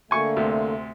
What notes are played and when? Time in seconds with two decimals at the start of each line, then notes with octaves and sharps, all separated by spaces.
0.11 D3 A3 A#3 G#5 C#6
0.36 D2 C3